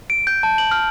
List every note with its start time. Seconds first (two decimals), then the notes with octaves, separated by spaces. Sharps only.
0.10 D7
0.27 G6
0.43 A5
0.58 F#7
0.71 F6